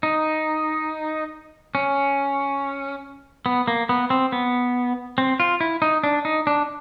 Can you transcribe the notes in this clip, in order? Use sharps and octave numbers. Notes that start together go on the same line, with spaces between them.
D#4
C#4
B3
A#3
B3
C4
B3
C4
F4
E4
D#4
D4
D#4
D4